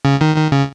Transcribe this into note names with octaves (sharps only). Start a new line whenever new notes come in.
C#3
D#3
D#3
C#3